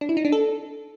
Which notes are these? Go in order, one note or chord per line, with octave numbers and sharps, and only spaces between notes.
D4
E4
D#4
D4
A4